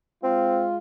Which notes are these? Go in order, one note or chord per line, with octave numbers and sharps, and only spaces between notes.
G#3 C4 F4